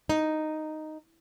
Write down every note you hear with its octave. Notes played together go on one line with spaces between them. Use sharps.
D#4